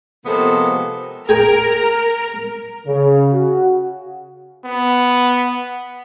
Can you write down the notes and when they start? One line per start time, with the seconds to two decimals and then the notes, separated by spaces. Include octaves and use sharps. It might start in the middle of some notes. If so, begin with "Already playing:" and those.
0.25 C3 F3 G#3 A#3 B3 A4
1.29 G#4 A#4 G5 G#5
2.87 C#3
3.32 F#4
4.65 B3